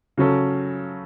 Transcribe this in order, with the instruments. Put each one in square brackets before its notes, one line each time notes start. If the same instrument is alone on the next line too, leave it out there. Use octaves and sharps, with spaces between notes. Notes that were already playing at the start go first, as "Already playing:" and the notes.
[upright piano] C#3 F#3 C#4 A4